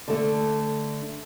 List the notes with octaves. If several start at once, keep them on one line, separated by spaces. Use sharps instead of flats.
D3 A3